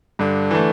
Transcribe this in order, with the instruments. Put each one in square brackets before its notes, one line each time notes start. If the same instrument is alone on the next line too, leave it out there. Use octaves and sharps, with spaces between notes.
[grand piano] G2 [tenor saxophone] D3
[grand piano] E3 A3